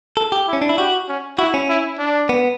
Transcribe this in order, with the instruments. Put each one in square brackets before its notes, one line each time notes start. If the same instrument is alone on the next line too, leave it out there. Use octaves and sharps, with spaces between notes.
[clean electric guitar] A4
G4
[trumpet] E4
[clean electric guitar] C#4
D4
E4
[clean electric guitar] F#4 [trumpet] G4
[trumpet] C#4
[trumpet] E4 [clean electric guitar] F#4
[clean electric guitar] C#4
[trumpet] E4
D4
[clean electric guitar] B3